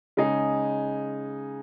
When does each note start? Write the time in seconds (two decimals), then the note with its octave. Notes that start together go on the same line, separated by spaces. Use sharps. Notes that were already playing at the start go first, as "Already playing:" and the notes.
0.17 C#3 G#3 D#4 G#4